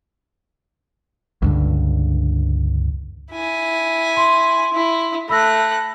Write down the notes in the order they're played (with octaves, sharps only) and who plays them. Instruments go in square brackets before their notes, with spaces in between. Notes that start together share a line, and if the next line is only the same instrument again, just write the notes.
[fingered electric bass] C#2 G2 D3
[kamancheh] E4 G#5
[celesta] C6
[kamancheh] E4
[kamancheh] A3 F#6 [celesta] B5 E6 A#6